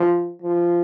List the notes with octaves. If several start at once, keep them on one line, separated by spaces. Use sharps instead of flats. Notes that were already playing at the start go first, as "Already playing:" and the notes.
Already playing: F3
F3